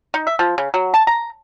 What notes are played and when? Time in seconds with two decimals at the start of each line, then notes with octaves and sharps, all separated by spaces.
0.14 D#4
0.27 E5
0.39 F3
0.58 C#3
0.74 F#3
0.94 A5
1.07 A#5